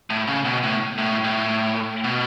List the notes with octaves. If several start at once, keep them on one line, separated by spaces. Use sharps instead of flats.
A2
C#3
B2
A2
A2
A2
B2